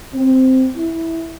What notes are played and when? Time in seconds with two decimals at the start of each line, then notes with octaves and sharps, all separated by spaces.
0.14 C4
0.75 E4